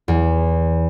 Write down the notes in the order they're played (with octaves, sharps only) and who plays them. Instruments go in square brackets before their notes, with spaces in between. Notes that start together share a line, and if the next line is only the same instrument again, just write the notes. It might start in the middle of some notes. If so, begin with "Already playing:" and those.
[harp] E2